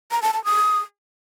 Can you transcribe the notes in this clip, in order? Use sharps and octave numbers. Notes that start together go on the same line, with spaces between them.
A#5
A5
A5
D#6